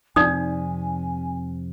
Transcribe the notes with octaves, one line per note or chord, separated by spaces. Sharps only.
F2 C3 D#4 D5 G#5 D#6